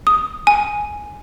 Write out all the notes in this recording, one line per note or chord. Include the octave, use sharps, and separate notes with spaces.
D#6
G#5